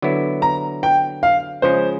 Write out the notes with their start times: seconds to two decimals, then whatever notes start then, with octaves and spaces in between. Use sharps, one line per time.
0.02 D3 F#3 B3 E4
0.42 A#5
0.83 G5
1.23 F5
1.62 C#3 F3 G#3 C#4 C5